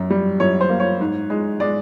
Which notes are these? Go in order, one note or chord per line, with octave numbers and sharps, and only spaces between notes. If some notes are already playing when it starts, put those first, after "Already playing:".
Already playing: F#2
G3
F#2 C#5
C5
A#3
C#5
G#2
G#3
G#3 D5